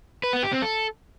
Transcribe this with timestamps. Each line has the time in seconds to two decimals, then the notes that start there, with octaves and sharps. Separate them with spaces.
0.23 B4
0.33 B3
0.43 G4
0.53 C4
0.62 A4